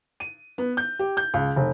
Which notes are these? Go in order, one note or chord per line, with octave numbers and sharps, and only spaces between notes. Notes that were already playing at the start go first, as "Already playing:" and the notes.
D#7
B3
G6
G4
G6
C#2
F1